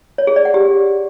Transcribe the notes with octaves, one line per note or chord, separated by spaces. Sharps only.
C#5
G#4
D5
F#5
G4